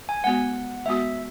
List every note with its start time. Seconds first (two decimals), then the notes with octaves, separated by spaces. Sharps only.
0.09 G#5
0.24 G#3 B3 F#4 F#5
0.86 G#3 B3 F#4 E5